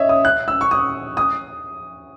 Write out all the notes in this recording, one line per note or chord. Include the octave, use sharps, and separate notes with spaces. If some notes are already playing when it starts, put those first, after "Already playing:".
Already playing: C#5 D#5 E5
D#6
F#6
E6
C#6
D#6
D#6